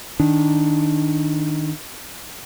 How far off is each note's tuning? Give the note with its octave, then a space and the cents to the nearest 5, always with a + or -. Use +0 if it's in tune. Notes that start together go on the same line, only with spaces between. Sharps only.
D#3 +0 D4 -5